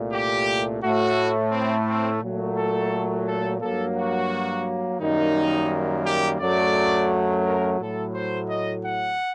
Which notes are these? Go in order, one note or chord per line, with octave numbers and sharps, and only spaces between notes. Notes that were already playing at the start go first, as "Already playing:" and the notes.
Already playing: C2 A#2 A3
G4
A2 A3 F#4
C4
C4
A#2 F#3 A3
A4
A4
G2 F#3 A#3 A4
F#4
F#2 D#3 G3 A#3 D#4
G4
F#2 F#3 A3 D5
A#4
A2 F#3 A3 A4
C5
D#5
F#5